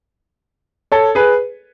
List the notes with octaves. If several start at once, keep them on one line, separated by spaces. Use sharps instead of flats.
A4 C#5
G#4 B4